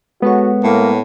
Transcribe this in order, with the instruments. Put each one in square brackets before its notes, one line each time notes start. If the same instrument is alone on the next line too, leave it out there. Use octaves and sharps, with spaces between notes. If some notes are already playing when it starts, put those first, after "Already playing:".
[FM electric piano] G#3 A4 C#5 [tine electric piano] B3 [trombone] F#4
[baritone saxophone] A2 [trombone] A#3